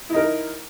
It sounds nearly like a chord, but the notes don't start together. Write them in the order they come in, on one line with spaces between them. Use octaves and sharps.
E4 D#4 A#4